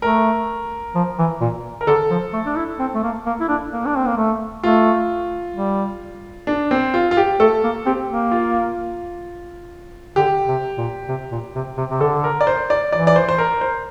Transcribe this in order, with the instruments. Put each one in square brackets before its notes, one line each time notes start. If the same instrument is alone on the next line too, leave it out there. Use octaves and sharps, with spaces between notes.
[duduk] A3 [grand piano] A#4
[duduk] F3
E3
A#2
[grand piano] A#4
[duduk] D3 [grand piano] A4
[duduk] F3
A3
D4
E4
C4
A3
A#3
A#3
E4
D4
A#3
D4
C4
A#3
A3
[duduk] A3 [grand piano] F4
[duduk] G3
[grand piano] D4
C4
F4
F4
G4
[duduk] A3 [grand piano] A4
[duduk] A#3
[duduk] C4 [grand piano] G4
[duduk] A#3
[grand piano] F4
[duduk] D3 [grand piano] G4
[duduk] C3
A#2
C3
A#2
C3
C3
C3
[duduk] D3 [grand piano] A4
[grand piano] A#4
D5
C5
D5
[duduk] E3 [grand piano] D5
[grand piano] D5
C5
C5
A#4
C5